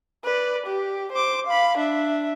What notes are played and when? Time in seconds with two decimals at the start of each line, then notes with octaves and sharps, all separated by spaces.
0.24 B4 D5
0.67 G4
1.12 C5 D6
1.47 F5 B5
1.77 D4 E5